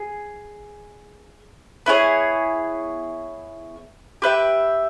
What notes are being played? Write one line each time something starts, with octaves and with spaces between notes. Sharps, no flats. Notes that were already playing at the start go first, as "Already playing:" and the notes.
Already playing: G#4
B3 E4 G#4 C#5
G4 B4 E5 G5